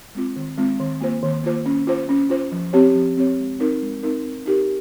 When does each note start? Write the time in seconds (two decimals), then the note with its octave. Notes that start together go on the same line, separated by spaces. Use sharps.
0.15 G#3 C4 F4
0.36 D#3
0.58 G#3 C4 F4
0.79 D#3
1.01 A#3 F4 C5
1.23 D#3
1.43 A#3 F4 C5
1.66 C#4
1.87 F4 C5
2.09 C#4
2.30 F4 C5
2.52 F3
2.73 C4 G4 C#5
2.95 F3
3.17 C4 G4 C#5
3.38 G#3
3.59 C4 D#4 A#4
3.82 G#3
4.03 C4 D#4 A#4
4.25 C4
4.46 D#4 G4 A#4